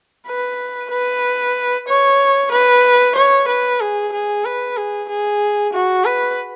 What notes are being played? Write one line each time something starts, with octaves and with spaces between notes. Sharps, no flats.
B4
B4
C#5
B4
C#5
B4
G#4
G#4
B4
G#4
G#4
F#4
B4